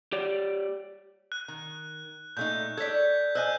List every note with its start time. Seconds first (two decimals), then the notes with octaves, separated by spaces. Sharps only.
0.12 G4 C#5 D5
1.32 F#6
1.48 D#3
2.37 A#2 A3 D#4 G6
2.77 A4 C#5 D5 G#6 B6
3.35 C5 D#5 G#5 E6 F#6 G6